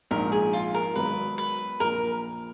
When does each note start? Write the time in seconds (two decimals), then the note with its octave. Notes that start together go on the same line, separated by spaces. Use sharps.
0.11 A#1 G#2 F3 A#4
0.32 G#4
0.53 F4
0.74 A#4
0.95 G#1 G#2 D#3 F#3 B3 B4
1.38 B4
1.80 A#1 A#2 F3 A#4